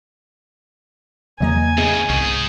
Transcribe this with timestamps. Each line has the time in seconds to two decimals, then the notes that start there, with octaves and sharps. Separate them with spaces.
1.40 E2 C#3 F#3 A#3 D#5 G#5 A#5
1.78 A2 C#3 B3 G#4 D#5
2.09 C2 G#2 G#4 C#6